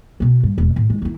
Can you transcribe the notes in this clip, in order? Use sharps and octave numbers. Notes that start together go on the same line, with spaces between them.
B2 C4
G2
E1
A2
G#3
D#3 E4